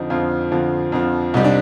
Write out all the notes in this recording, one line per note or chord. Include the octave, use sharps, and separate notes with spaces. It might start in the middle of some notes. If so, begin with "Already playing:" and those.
Already playing: F2 D3 F3 D#4
F2 D3 F3 F4
F2 D3 F3
F2 D3 F3
C2 C3 G3 D#4
D4